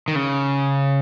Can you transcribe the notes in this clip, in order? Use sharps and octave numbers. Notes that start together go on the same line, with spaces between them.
D#3
C#3